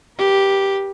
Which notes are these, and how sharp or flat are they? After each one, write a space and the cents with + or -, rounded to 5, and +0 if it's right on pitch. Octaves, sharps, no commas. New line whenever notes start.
G4 +0 B4 -40